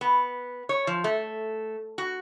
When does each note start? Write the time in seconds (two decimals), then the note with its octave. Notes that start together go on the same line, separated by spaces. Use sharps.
0.01 B3
0.69 C#5
0.87 F3
1.04 A3
1.98 F#4